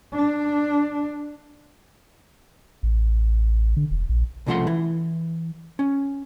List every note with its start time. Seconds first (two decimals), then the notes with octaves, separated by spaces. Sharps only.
0.14 D4
2.83 A1
3.77 D3
3.91 E1
4.09 A#1
4.46 C2 C#3 F3 A3 F#5 C6
4.67 E3 E4
5.79 C#4